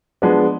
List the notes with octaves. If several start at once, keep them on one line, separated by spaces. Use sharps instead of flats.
F3 G#3 B3 D4